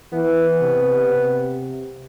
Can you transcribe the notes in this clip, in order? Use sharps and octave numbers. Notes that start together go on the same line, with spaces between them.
E3 B3
C3
C3